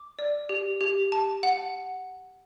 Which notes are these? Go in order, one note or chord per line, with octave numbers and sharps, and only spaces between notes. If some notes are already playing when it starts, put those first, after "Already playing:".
Already playing: D6
D5
G4
G4
A5
F#5